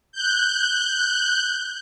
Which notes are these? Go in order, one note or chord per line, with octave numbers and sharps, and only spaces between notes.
F#6 G6